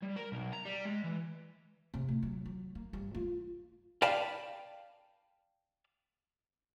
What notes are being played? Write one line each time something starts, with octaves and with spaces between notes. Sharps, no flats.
G3
A#4
B1
A#5
G3
G#3
E3
C3
A2
F#3
F#3
A#3
G2
F4
D5 F5 G5 A5 B5